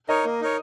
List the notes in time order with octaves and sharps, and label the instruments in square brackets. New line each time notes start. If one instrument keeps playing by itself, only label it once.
[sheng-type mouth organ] D#4 A#4 C#5 [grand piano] D#5
[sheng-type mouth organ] A#3
D#4 A#4 C#5